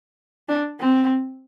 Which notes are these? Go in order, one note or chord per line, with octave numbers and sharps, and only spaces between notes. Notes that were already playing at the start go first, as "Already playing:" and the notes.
D4
C4